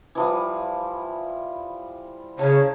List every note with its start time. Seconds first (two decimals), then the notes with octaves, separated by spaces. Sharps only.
0.15 E3 F3 G3
2.39 C#3 C#5 A5 A#5